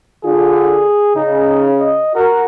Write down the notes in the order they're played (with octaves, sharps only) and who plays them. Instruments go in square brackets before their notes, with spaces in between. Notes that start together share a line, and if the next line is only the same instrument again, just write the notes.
[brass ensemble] D3 F4 [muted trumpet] G#4
[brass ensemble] C#3 [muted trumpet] D#4
[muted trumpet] D#5
[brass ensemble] F#4 [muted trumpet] A#4